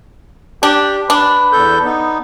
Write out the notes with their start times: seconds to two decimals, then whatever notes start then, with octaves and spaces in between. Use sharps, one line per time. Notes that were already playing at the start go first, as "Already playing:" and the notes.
0.63 D4 G4
1.10 D4 B4
1.53 E2 A4 G6
1.84 B3 D#4